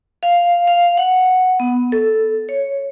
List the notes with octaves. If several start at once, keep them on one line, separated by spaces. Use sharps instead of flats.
F5
F5
F#5
B3
A4
C#5